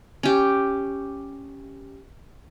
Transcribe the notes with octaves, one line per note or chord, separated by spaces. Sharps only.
C#4 G4